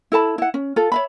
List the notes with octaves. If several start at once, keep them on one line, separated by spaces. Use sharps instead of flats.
E4 A4 A5 B5
E4 F#5
C#4
F4 A4
C#5 E5 B5